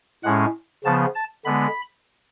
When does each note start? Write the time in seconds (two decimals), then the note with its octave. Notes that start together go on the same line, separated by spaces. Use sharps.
0.23 A2 G#3 C#4 F#5
0.84 C#3 F3 B3 A5
1.15 A5
1.45 D3 G#3 B3 B5